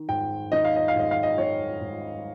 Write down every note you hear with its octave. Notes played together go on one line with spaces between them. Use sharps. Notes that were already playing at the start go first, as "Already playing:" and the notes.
Already playing: D#3
G#2 G5
D#3 D#5
F5
D#5
F5
G#2 D#5
F5
D#5
D#3 C#5
G#2